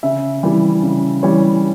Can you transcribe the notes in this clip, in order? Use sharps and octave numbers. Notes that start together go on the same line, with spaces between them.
C#3 E5
E3 G3
C#3
E3 G3 C#5